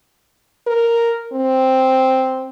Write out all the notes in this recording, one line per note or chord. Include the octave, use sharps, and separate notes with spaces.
A#4
C4